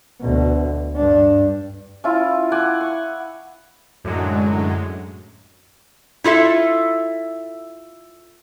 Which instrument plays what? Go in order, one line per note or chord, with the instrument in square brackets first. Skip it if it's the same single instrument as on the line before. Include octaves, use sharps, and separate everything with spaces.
[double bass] D2 B2
G2 D4
[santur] C#4 E4 F4
F#5 G#5 D6
C#6
[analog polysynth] F#2 A2 D3 F#3 G#3
[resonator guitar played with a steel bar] E4 F4 A4 E5